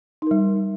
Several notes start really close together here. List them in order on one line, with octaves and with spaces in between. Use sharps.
D#4 A#4 G3